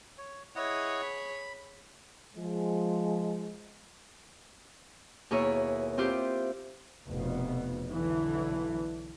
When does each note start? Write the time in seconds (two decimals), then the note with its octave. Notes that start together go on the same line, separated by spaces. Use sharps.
0.18 C#5
0.56 E4 G#4 C#5 D#5 F#5
1.03 B5
2.36 F3 G#3
5.31 D#2 B2 E4 G#4 A#4 C#5
5.98 C4 E4 F4 G4 C5
7.05 F1 B2 B3
7.91 B1 D3 E3